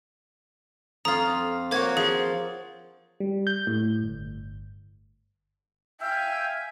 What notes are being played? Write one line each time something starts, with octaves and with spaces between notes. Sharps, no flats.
F2 F4 A#5 D#6
A#3 F#4 C5 C#5 G#6
F3 G#4
G3
G6
A2
G1
E5 F5 G5 G#5 E6 G6